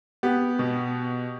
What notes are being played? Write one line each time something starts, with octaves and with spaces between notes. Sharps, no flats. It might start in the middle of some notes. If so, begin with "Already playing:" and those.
B3 G4
B2